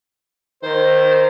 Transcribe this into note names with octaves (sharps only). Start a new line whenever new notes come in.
D#3 C5